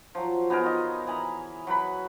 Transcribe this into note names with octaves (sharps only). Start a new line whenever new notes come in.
F3 F#3
B3 D#4 G#4 A#4
F4 D#5
E3 G#5 A#5 B5
F#3 B4 B5